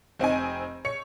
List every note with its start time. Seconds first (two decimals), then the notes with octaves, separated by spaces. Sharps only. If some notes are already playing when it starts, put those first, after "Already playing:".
0.19 F1 C4 D#4 G#5
0.85 C#5 C#7